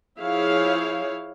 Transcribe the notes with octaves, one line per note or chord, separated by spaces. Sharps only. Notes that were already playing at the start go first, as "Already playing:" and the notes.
F3 E4 G#4 C#5 F5